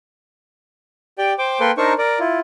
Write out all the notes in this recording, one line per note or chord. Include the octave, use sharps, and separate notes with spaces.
G4 D5 G5
C5 G5 D6
A#3 A4 B4 G5 C6
D4 D#4 A#4 C5 C#6
A#4 D5
E4 F4